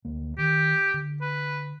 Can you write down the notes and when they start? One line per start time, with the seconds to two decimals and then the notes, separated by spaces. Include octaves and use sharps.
0.05 D2 A#3
0.38 D#3 G4
0.94 D3
1.21 B4